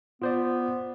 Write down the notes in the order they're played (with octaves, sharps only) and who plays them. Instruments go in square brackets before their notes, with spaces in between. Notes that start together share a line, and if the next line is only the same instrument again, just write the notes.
[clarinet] B3 [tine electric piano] F4 C5 D5